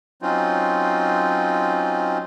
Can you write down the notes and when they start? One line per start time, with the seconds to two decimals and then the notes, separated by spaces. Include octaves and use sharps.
0.22 F#3 C4 C#4 D#4 F4